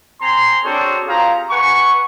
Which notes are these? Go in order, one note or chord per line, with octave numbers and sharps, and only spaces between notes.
C4 G#5 A#5 C6
C4 D4 F#4 G#4 A4 C#5
C4 F4 G4 G#4 F5 A#5
B4 F#5 G#5 C#6